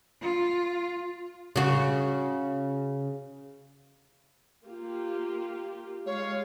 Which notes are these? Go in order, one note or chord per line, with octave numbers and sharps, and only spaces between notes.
F4
C#3 F#4
A#3 F4 G4
G#3 C#5 F5